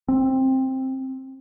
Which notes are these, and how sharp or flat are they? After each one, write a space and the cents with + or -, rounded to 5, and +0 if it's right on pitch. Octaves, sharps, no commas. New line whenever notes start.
C4 +10